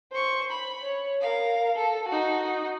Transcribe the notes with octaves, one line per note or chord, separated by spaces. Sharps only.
C5 C#6
B5
C#5
A#4 F5
A4
D#4 F#4